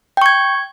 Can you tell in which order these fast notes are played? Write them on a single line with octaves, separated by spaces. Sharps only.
G5 C#6 G#6